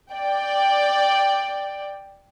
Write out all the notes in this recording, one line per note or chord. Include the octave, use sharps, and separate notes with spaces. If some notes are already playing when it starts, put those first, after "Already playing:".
D5 G5